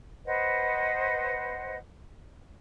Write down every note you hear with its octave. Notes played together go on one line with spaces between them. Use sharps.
B4 C5 D#5 F#5